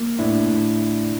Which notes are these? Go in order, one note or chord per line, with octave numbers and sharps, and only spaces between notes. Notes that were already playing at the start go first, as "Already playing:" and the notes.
Already playing: A#3
A2 D4 E4
A2